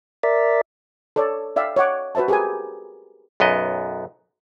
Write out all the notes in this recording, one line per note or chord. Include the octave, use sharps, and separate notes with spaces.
A#4 D5 E5
A4 C#5 D5
D5 E5 F5 G5
C#5 D#5 F#5 D6
F#4 B4 C5 E5 A5
G4 G#4 A#4 C5 G#5
B1 F#2 B3 D#5